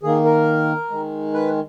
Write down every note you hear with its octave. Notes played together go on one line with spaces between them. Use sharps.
D#3 A#3 G#4
A#4
D#3 G#3
B4